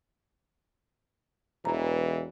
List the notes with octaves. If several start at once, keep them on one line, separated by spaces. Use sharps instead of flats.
E1 E3 A#5